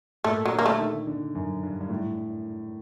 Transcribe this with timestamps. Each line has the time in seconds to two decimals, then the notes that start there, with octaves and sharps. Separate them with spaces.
0.24 A#2 A3
0.46 F#3
0.52 D3
0.59 A#3
0.66 A3
0.80 D#3
1.07 D3
1.35 F#2
1.63 G2
1.81 G2
1.90 A2